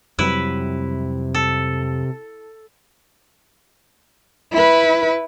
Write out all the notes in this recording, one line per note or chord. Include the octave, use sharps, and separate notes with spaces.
F2 C3 F#3 G3 E4 B4
A4
E4 B4